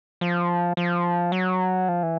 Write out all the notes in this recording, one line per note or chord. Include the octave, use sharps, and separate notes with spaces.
F3
F3
F#3
F3
E3